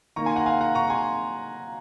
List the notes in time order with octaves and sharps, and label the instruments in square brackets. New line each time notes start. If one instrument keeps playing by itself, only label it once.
[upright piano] D#3 A#3 A#5 C#6
G#5 C6
F#5 A#5
F5 G#5
F#5 A#5
A#5 C#6
G#5 C6